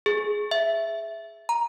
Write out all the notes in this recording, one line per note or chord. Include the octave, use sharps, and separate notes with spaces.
G#4
E5
A#5